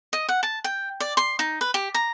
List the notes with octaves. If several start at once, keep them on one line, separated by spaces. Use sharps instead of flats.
D#5
F#5
A5
G5
D5
C6
D#4
B4
G4
A#5